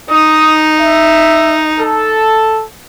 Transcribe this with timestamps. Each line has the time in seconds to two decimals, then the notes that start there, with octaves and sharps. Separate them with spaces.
0.10 D#4 D#6
0.80 E5
1.78 A4